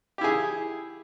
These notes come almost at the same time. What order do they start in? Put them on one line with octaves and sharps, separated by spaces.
G4 E4 G#4